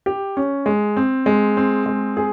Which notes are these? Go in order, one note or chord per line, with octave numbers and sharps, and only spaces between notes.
G4
C#4
G#3
C4
G#3
C4
G#3
G#4